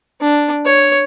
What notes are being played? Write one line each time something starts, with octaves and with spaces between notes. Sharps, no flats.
D4
C#5